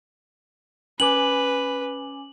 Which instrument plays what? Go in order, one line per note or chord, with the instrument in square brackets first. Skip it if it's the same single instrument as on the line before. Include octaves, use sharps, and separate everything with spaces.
[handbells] C#4 G#5 D6 [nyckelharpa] B4 [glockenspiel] F#7